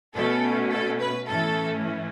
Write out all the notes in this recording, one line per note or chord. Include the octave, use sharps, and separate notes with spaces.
B2 A3 C#4 A4
A4
B4
A2 E3 A3 C#4 A4